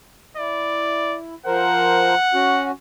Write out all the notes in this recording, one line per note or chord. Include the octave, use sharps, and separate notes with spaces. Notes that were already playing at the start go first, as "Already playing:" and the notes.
E4 D5
F3 A#4 C5 F#5
C#4 F#4